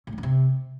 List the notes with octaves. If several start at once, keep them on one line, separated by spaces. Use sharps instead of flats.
A2
D#3
G2
C3